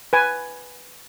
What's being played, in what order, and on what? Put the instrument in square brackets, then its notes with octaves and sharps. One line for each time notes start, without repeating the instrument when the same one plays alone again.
[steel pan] B4 G#5